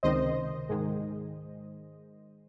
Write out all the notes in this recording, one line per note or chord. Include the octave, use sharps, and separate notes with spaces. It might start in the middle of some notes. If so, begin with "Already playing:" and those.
C#2 C3 D#3 C5 D#5
G#2 D#3 G#3